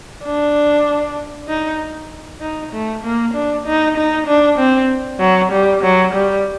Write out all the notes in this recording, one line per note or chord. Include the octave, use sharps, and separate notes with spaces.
D4
D#4
D#4
A3
A#3
D4
D#4
D#4
D4
C4
F#3
G3
F#3
G3